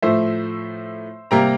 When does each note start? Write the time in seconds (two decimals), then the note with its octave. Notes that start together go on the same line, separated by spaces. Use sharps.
0.02 A2 F3 A3 C5 E5
1.31 C3 G3 A#3 G5 A#5